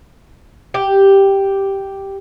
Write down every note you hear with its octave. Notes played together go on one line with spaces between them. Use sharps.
G4